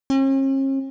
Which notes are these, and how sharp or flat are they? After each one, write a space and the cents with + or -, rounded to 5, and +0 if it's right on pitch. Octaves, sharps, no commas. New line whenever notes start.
C#4 -45